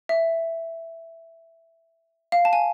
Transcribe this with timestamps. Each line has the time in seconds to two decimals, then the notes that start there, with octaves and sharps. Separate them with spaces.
0.09 E5
2.32 F5
2.45 A5
2.53 G#5